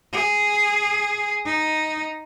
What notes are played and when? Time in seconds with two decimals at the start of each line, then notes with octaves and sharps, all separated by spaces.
0.13 G#4
1.46 D#4